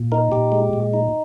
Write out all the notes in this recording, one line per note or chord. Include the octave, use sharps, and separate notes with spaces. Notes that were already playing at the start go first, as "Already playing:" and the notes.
Already playing: A#2
D#4 A#4
A#2 G4
G#3
A#2
D#4